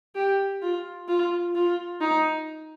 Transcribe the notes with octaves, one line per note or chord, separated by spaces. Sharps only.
G4
F4
F4
F4
D#4